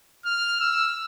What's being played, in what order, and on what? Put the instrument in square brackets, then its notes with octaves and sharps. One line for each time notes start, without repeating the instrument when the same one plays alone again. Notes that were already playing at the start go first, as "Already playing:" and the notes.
[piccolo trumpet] F6
E6